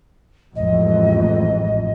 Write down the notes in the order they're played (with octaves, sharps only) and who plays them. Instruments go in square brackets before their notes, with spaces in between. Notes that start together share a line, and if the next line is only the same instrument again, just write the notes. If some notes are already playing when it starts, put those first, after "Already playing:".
[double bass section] A1 F2 G#2 [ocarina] D#5